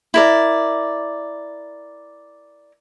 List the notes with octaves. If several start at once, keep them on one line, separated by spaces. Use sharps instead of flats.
E4 A#4 D5